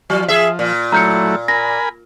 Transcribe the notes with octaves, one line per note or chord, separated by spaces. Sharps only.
F3 F#3
G#4 E5
A#2
F#3 A3 E4 A#5 G6 C#7
A#4 G#5 B5 A#6